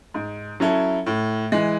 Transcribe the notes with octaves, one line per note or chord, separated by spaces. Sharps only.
G#2
F#3 C#4 E4 A4
A2
E3 G#3